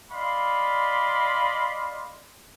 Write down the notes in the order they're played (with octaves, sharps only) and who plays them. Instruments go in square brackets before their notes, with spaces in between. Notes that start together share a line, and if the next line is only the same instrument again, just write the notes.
[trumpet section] D5 D#5 F5 B5 C6